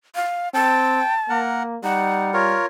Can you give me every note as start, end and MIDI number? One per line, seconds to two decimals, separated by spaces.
0.15 0.49 77
0.54 1.00 60
0.54 1.14 79
0.54 1.39 81
1.30 1.78 58
1.30 1.63 70
1.30 1.63 78
1.84 2.57 55
1.84 2.31 63
1.84 2.35 78
2.34 2.66 65
2.34 2.66 70
2.34 2.66 73